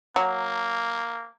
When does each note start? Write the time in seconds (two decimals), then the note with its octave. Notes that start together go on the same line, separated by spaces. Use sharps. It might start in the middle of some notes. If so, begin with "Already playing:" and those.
0.16 F#3 A#3